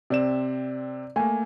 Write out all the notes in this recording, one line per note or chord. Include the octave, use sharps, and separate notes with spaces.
C3 C4 D5 E7
A3 A#3 G#5